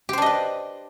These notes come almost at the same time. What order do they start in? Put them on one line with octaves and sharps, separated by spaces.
G4 C5 D4 D#5 B4